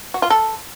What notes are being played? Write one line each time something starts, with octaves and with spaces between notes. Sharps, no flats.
F#4
F4
A4